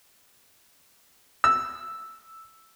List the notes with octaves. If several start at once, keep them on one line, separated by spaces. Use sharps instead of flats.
E6